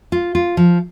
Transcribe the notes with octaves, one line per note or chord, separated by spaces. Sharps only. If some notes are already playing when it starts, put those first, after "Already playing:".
F4
F4
F3